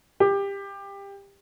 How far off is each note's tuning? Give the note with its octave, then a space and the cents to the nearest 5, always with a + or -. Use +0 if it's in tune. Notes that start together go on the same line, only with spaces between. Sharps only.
G4 +20